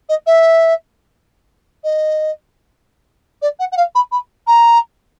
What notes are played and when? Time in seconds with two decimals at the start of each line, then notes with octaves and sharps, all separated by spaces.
0.09 D#5
0.27 E5
1.84 D#5
3.42 D5
3.60 F#5
3.72 F#5
3.77 F5
3.95 B5
4.12 B5
4.47 A#5